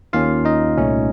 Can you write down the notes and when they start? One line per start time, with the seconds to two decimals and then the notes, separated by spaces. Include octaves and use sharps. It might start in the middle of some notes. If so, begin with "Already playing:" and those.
0.13 D#2 D#3 A#3 C#4 F4 F5
0.45 D#4 D#5
0.78 C2 A#2 A3 C#4